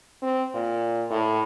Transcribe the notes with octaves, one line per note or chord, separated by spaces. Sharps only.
C4
A#2
A2